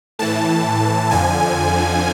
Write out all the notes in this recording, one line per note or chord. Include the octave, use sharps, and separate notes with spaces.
A2 E3 A5
F2 D3 F3 G#5